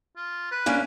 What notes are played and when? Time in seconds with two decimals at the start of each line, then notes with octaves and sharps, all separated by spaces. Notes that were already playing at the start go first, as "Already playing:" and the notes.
0.17 F4
0.52 B4
0.66 A#3 C#4 D4